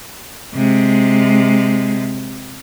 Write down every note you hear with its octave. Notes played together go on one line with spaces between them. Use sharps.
C3 G#3